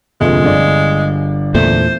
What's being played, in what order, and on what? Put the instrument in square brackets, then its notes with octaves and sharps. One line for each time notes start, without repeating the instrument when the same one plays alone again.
[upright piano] F1 D2 A#2 [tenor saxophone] G#3
[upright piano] G1 D5
[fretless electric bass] E2 A#2 A3 [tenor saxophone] C5